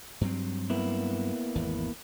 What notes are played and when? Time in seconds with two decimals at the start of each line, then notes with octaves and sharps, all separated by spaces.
0.21 G2 F#3 C4
0.70 A#3 B3 E4
1.55 G#1 E2